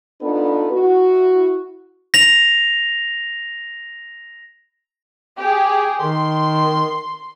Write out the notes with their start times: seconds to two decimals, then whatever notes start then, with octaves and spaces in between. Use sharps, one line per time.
0.21 B3 D4 D#4 F4 A4 B4
0.73 E4 F#4
2.14 A#6 F7
5.38 G4 G#4
6.02 D#3 C6